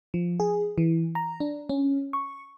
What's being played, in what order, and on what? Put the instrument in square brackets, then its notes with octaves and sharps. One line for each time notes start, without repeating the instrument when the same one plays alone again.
[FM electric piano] F3
G#4
E3
A#5
D4
C#4
C#6